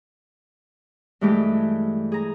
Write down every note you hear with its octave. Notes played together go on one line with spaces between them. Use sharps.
G2 E3 G#3 A3 G4 G#4
G#4 A#5